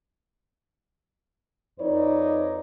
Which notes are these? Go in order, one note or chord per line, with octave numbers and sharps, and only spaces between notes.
F2 D#4 B4 C#5 D5